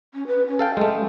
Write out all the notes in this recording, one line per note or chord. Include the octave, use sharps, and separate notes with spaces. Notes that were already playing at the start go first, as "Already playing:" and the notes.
C#4
B4
C#4
A4 F5 G5
G#3 A3